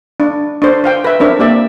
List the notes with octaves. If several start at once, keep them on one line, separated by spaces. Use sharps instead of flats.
D4
D4 C5
C5 F5 G5
B4 E5
C4 D4 A#4 E5
A#3 G4 D5 E5